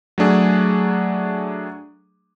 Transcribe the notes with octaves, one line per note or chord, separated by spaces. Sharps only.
F#3 A3 D4 G#4